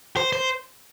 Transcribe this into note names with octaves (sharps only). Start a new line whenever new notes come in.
C5
C5